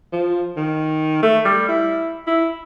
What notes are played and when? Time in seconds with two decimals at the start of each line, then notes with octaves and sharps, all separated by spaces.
0.13 F3
0.57 D#3
1.23 A3
1.45 G3
1.69 E4
2.27 E4